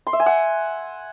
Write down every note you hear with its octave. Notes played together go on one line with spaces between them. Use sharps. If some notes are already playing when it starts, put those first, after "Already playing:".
C6
E5
G#5
F#5